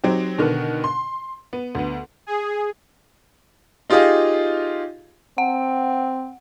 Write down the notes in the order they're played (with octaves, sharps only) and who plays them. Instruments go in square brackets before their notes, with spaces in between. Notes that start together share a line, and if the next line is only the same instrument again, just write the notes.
[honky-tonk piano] F#3 C4 D#4 G4
B2 D3 D#3 B3
C6
B3
D2 B3
[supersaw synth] G#4
[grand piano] D#4 F4 G4 G#4 D#5 F5
[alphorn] C4 [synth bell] F#5